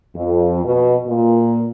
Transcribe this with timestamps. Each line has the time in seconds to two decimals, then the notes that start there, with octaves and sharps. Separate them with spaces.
0.16 F2
0.64 B2
1.07 A#2